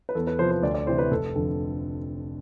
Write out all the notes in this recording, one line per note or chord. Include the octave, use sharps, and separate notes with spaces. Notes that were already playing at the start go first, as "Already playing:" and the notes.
B4
E2 A4
B4
C3 F3 C5
C5
D2 D5
D5
C3 E3 C5
B4
F1 A4
F2 D3